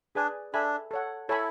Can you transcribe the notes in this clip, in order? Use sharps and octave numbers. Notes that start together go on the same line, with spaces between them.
D4 G#4 B4 D5 G#5
D4 A4 E5 G#5 B5
A4 C#5 F#5
E4 A4 C#5 G#5 B5